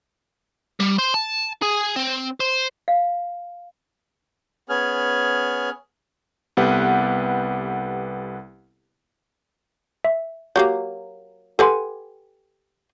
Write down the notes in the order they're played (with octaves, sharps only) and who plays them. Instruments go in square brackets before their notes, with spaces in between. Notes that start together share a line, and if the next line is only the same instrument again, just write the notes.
[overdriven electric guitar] G3
C5
A5
G#4
C4
C5
[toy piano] F5
[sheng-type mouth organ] B3 C#4 G#4 G#5 F6
[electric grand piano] C2 B3 G4 A4 B4 F#5
[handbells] E5
[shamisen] F#3 A3 A#3 [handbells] G4 G6
[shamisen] G4 B4 G#5 [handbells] A4 F#5 C6